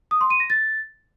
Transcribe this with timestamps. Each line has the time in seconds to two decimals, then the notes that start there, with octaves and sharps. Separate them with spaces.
0.11 D#6
0.21 C6
0.30 D#7
0.40 A#6
0.50 A6